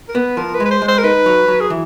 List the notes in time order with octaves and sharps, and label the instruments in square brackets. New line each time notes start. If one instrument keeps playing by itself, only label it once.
[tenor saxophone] A#4
[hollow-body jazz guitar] B3 [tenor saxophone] B4
[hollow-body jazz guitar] F3 [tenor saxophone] A#4
[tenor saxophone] B4
[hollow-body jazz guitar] G#3
[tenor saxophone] B4
C5
[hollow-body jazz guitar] G#3
[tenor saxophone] C5
A#4
[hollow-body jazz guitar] D#4 [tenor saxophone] B4
[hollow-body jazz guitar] F#3
F#3
[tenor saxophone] G#4
[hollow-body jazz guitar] E3